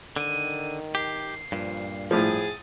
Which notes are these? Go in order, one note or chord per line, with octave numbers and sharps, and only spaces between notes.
D3 D#3 D#7
G4 C7
G2 A#2 F3
A2 F3 G#4 D#6 A6